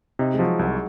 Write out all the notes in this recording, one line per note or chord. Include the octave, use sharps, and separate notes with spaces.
C3 D#4
G#3
F3 F#3
C2 F#3